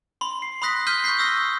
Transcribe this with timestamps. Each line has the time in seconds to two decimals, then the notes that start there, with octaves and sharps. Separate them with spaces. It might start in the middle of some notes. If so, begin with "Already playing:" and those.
0.21 B5 C6
0.42 C7
0.62 B5 C6 D#6 F#6 A#6 B6
0.87 C6 F6 G6 B6 D#7 G7
1.04 C#6 F6 G6 B6 C7
1.19 D#6 E6 A#6 G7